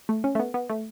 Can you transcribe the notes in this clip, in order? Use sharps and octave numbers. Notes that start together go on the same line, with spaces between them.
A3
C#4
A3
B3
B3
A3